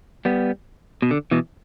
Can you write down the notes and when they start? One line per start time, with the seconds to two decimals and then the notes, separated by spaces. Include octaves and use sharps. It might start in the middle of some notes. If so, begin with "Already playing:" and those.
0.25 G3 B3
1.02 B2
1.11 D3
1.31 B2 E3